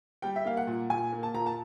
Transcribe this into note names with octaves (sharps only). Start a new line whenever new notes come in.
G3 G5
E5
A#3 F5
F#5
A#2
A#2 G#5
A#3
A5
A#2 A#5
A5